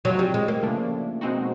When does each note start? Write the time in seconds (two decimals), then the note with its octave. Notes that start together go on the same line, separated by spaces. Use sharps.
0.05 C3 F3 F#3 G#3 C4
0.19 G3
0.34 G#3
0.48 A#3
0.63 C#3 F3 A3 D4
1.21 B2 G#3 C4 D#4 F#4